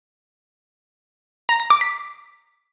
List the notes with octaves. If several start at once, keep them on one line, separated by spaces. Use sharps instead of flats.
A#5
A#6
D6
B6